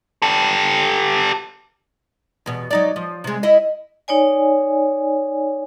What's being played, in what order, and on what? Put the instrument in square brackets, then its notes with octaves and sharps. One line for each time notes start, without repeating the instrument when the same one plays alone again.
[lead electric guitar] G4 A4
[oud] E2 B2
F#3 D#4 D5
F3
C3 G#3
E4 D#5
[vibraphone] D#4 C#5 D5 G#5